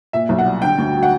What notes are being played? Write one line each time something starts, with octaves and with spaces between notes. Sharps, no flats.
A#2 E5
B1
F#5
G3
D3 G5
D2
F#3
F#5